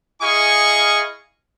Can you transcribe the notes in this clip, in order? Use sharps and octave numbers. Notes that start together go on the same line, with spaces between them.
E4 G#4 D#5 F5 G#5 C#6